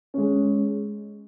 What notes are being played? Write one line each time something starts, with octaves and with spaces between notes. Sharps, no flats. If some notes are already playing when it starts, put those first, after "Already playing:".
G#3 C#4